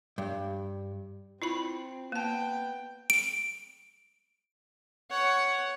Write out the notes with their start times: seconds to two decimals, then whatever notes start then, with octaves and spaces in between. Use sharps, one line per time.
0.18 G2
1.42 C4 E4 F4 B5
2.12 A#3 B3 G5 A5
3.10 D7
5.10 C#5 F#5